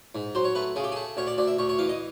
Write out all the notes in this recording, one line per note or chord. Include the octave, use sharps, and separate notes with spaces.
G#2
F#3 C5
C#5
A3 B4
C#3 G#4
G4
A3 G#4
D2 C#5
D5
D2 D5
E5
D2 C#5
C#5
E3 F5
D#5